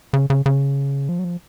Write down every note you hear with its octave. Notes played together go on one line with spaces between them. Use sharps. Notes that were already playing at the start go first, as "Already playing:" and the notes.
C#3
C#3
C#3
F3
F#3
F3